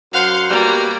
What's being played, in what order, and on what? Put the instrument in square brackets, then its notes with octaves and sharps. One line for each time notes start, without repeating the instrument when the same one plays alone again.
[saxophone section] F#2 C5 F#5 [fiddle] F5
[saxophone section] B2 G3 [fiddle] A#3